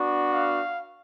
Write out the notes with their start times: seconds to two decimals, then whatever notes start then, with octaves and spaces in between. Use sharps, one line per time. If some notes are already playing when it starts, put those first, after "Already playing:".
Already playing: B3 D4 F#4
0.30 F5